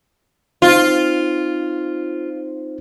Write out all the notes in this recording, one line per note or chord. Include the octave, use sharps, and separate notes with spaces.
C4 D#4 F4 C5